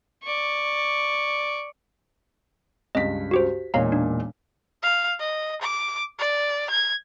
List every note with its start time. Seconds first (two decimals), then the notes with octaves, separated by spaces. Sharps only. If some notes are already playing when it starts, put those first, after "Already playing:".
0.23 D5 C#6
2.95 C#2 G2 D#5 B6
3.31 F#4 G4 C5
3.74 E1 A#2 D#4 C#5 F5 A#5
3.92 D4
4.83 F5
5.19 D#5
5.62 D6
6.19 D5
6.70 G#6